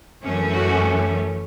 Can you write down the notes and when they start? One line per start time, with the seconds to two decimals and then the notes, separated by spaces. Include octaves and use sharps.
0.24 F#2 E3 A3 C#4
0.52 F#4